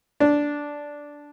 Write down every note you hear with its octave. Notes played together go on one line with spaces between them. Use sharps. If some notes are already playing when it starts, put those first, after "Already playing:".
D4